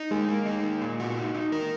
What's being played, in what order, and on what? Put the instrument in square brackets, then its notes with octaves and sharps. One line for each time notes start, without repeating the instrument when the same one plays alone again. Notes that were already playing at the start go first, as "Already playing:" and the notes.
Already playing: [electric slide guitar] D#4
[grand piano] G#3 [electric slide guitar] A#3
[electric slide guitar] A#3
D#4
A#3
A#2
F#4
D#4
D#4
[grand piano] A#3 [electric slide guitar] A#4